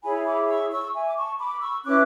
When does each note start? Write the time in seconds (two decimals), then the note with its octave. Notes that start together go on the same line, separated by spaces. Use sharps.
0.03 E4 G#4 C#5 G#5 B5
0.26 B5 D6
0.48 C#6 E6
0.71 C#6 E6
0.94 E5 G#5
1.07 D6
1.16 A5 C#6
1.39 B5 D6
1.61 C#6 E6
1.84 C#4 E4 B4 D6 F#6